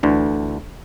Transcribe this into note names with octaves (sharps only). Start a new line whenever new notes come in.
D2 D3 E3